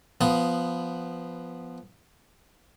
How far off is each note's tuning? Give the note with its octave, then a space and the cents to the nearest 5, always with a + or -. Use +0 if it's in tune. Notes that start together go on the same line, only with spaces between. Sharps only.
F3 -10 B3 +0 D#6 +0